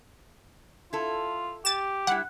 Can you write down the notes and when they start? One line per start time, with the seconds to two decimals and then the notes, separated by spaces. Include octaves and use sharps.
0.93 E4 F4 A4
1.65 G4 A6 E7
2.07 G3 E4 F#5